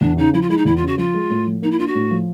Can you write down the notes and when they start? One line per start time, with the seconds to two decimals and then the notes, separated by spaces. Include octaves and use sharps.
0.01 E2 D4
0.17 C#3 D#4
0.33 F3 E4
0.42 F4
0.49 G#3 E4
0.57 D#4
0.65 E2 E4
0.76 F4
0.82 C#3
0.87 F#4
0.98 F3 F4
1.14 G#3
1.30 A2
1.46 F3
1.62 A#3 D#4
1.71 E4
1.79 D4 F4
1.87 F#4
1.95 A2
2.11 F3